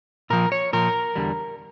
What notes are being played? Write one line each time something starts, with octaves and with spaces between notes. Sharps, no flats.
A#2 F3 A#4
C#5
A#2 F3 A#4
E2 D3 G3